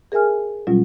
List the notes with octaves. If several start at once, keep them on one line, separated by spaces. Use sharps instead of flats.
G#4 A#4 E5 G#5 F6
B2 F#3 G3 C#4 F4